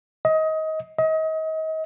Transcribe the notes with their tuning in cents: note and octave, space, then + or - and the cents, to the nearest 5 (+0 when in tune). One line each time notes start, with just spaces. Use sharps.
D#5 +25
D#5 +35